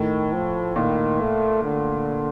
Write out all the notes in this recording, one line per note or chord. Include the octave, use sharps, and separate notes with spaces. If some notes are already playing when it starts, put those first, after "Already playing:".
Already playing: A2 D#3
F3
A#2 D#3
A3
D3